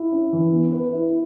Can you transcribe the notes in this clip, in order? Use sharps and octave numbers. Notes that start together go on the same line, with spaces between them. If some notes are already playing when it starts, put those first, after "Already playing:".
Already playing: E4
C#4
E3
B3
B4
E4